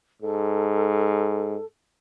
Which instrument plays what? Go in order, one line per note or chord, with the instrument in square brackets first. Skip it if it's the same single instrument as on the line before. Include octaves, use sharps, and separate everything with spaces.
[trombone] G#2 [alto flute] A4